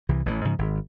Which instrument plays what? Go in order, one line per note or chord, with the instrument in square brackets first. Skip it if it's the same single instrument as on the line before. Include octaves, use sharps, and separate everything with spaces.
[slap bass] C2 E3
A1 E3
G#2 C#3 F3
G#1